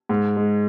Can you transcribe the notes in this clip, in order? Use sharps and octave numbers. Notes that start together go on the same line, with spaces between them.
G#2
G#3